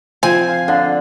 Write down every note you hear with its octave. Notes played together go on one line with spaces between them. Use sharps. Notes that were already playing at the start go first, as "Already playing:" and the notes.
F3 C4 G#5
F5
D3